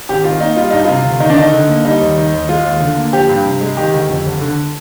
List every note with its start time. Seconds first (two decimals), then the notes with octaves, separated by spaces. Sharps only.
0.09 G#1 G4
0.24 D#3 F4
0.40 A#3 D#4
0.56 G3 F4
0.70 G2 D#4
0.85 C3 F4
1.05 D2
1.20 D#3 D#4
1.30 D4
1.37 D2 D#4
1.53 D3
1.69 A#3
1.85 G3 D#4
2.01 D#2
2.17 D#3
2.33 D#2
2.49 G#3 F4
2.65 D#2
2.80 D3
2.97 A#3
3.13 F3 G4
3.29 G2
3.45 C3
3.61 G#3
3.77 D#3 G4
3.93 D2
4.09 F2
4.25 G1
4.41 D3